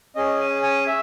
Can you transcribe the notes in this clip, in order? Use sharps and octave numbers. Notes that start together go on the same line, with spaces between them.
C#4 G#4 D#5
G#5
G#5
E5